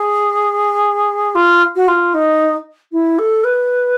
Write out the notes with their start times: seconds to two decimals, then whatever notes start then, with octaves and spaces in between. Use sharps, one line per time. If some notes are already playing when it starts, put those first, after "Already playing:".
Already playing: G#4
1.35 F4
1.75 F#4
1.87 F4
2.14 D#4
2.92 E4
3.18 A4
3.44 B4